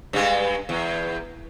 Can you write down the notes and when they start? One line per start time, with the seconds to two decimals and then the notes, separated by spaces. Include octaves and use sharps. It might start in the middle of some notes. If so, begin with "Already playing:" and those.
0.13 G2 G#3
0.69 E2